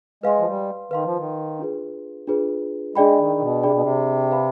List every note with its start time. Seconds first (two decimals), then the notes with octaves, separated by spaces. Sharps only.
0.23 G#3 B4 F5 C6
0.39 F3
0.47 G3
0.91 D#3 B4 F5 C6
1.05 F3
1.18 D#3
1.59 D4 F4 G#4 B4
2.27 D4 F4 G#4 B4
2.95 G#3 D4 G#4 D5 G5 B5
3.19 D#3
3.40 B2
3.63 C3 D4 G#4 D5 G5 B5
3.73 B2
3.82 C3
4.31 B4 F5 B5